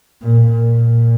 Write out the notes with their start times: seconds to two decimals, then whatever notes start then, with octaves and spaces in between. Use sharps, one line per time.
0.22 A#2
0.52 A#2